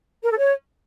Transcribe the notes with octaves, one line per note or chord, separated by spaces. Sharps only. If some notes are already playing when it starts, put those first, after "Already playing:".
A#4
A4
C#5